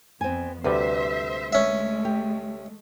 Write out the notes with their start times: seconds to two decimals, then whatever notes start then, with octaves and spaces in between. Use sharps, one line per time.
0.21 F2 B3 C4 G#5
0.64 D2 C3 G3 B4 C5 E5
1.53 G#3 A3 C#4 E5
2.05 G4